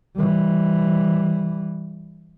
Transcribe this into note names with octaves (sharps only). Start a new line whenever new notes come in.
E3 G3